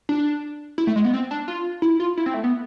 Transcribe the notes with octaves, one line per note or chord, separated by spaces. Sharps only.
D4
E4
A3
G#3
B3
C4
D4
F4
E4
F4
E4
C4
A3
B3